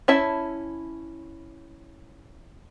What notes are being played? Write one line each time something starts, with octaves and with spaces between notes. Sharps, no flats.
C#4 E4 E5 A5